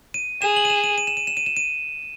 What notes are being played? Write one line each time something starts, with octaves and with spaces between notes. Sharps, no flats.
D#7
G#4 E7
F#7
D#7
E7
D#7
D#7
E7
D#7
E7
D#7
E7
D#7